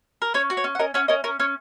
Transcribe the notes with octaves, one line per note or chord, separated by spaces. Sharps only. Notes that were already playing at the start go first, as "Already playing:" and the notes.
A#4
C#4 C#5
F#4
C#5
C#4
F#5
C#4 A#4 D#5
C#4 C#5 F#5
C#4 A#4 D#5
C#4 A#4
C#4 C#5